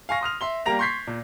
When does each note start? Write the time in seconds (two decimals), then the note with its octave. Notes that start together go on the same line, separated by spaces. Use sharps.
0.09 F5 G#5 C#6 A#6
0.21 C6 D#6 F6 F7
0.41 E5 C6 G7
0.66 G3 A#3 G4 A#5 A#6 F7
0.79 C6 C#6 G6 G#6 B6 C7
1.07 A#2